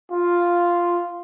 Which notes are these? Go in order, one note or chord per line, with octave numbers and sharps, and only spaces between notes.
F4